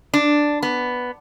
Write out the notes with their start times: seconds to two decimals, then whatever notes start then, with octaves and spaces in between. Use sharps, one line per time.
0.14 D4
0.63 B3